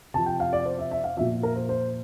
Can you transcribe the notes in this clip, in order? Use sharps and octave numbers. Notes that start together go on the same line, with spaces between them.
C3 F3 A5
G5
F5
D5
C5
E5
E5
F5
A#2 F3 E5
A#4
C5
C5